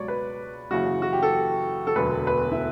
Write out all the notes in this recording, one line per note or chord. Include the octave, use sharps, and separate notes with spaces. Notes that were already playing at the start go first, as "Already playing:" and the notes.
Already playing: C#2 B2 F#3 C#5 D5
B4
F#1 F#2 C#3 E3 F#4
F#4
G4
A4
A4
E1 D2 D3 F#3 B4
B4
E4